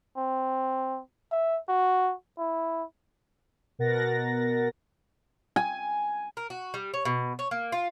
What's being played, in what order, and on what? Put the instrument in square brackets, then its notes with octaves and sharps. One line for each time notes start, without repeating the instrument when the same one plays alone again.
[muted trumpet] C4
E5
F#4
E4
[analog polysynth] B2 A#4 F#5 A6 A#6
[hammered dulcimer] G#5
[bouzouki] A#4
F#4
G3
C#5
B2
C#5
A#3
F4